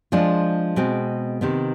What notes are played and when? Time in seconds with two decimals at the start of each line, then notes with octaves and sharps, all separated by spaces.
0.12 F3 G#3 D4 F4
0.76 B2 G#3 C4
1.41 C3 D#3 B3